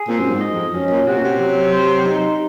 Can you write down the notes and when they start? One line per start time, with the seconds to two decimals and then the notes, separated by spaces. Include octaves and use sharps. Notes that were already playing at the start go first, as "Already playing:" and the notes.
Already playing: G#4
0.08 A#2 C4
0.20 F#2
0.30 G#2
0.41 D#5
0.52 F2
0.74 F#2 C#4
0.90 A#2
1.07 C3 F#4
1.18 A#2
1.24 C3
1.40 F#3
1.73 C5
2.06 D#4